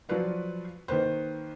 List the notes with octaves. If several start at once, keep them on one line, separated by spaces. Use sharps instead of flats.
F3 F#3 F4 F#4 B4 D5
D#3 A#3 B4 C5